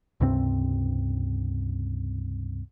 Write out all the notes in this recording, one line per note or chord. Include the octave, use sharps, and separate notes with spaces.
C#2 G2 C3 C4